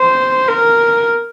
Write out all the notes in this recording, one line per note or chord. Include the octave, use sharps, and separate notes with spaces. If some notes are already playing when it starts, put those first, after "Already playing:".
Already playing: C5
A#4